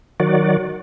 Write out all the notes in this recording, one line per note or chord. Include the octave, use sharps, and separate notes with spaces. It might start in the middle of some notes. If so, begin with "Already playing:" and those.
D#3 F#3 F#4 D5